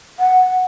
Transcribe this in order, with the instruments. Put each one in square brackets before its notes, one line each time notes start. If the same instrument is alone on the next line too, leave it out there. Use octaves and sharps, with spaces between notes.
[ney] F#5